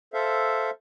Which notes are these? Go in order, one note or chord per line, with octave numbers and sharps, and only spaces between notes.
A4 C5 E5 F5